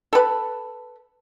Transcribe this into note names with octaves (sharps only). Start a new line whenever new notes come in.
A4 B4